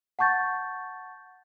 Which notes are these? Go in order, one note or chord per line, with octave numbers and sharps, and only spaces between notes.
F#5 A5 C#6 G6 A6